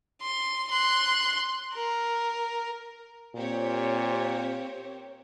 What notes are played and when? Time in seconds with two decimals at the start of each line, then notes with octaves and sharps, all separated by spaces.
0.22 C6
0.71 C6 F#6
1.75 A#4
3.35 A#2 C4 G4 C#5